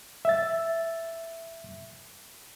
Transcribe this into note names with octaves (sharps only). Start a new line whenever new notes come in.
E5 A6